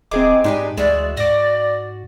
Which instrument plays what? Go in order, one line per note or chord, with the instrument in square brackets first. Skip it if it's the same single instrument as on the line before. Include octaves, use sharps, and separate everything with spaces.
[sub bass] D1 [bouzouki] D#3 E3 G#3 [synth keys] C4 G#4 D6
[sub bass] G#2 [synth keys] G#3 D#4 G4 [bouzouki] D4 B4 G#5
[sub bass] D2 [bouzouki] E3 F#4 E5 [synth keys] G#3 [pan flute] D5
[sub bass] G#2 [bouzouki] F#4 [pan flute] D5 [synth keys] D6 A#6